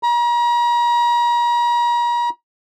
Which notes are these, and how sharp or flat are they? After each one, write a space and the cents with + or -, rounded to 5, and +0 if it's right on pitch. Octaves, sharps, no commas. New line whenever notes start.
A#5 +40